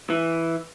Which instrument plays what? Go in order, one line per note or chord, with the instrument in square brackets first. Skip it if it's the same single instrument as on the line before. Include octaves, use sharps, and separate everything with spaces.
[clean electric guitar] E3